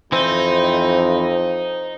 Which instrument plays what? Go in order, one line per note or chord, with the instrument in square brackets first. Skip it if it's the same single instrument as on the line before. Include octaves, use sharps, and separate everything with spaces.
[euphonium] F2 [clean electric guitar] E3 C4 [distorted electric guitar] D#4 [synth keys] C5